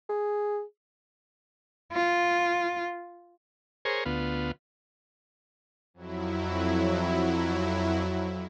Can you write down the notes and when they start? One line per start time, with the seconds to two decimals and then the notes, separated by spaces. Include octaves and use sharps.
0.09 G#4
1.92 F4
3.85 G#4 A#4 C5 C#5
4.05 D2 B3 F4
5.94 F2 F#3 E4